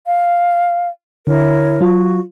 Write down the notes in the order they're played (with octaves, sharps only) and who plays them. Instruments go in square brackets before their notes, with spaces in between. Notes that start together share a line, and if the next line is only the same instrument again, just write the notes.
[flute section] F5
[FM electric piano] D3 [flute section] E4 A#4 C#5
[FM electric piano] F#3 F4 [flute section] F#4